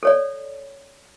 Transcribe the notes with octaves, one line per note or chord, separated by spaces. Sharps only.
A4 C#5 D5